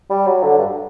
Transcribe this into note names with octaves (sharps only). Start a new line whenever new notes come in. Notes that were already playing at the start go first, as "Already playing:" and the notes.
G3
F#3
D3
G2